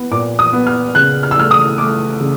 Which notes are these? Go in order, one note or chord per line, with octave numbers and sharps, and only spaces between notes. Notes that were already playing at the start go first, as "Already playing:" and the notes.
Already playing: B3
A#2 D6
D#6
B3
F6
C#3 F#6
F6
E6
A3 F6
D#6
A3 D6
C#3